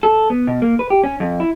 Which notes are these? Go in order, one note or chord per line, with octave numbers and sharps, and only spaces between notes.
A4
B3
B2
A#3
B4
G4
C#4
F2
E4